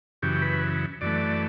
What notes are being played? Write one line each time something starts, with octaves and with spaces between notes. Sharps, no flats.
F#2 C#3 E3 G4
B4
F#2 E3 A3 D5